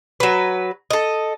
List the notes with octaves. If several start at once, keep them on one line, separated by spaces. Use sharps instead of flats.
F#3 B4
A4 D#5